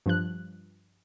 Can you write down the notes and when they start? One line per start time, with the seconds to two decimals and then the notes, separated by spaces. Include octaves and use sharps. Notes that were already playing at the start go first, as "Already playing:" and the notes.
0.06 G2 F3 F#6